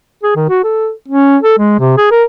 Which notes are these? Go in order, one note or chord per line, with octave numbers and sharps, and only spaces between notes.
G#4
D#3
F#4
A4
C#4
A4
G#3
C3
G#4
A#4